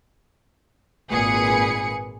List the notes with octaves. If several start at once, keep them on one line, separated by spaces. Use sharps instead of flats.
G#1 A#2 G#4 B4 G#5 C#7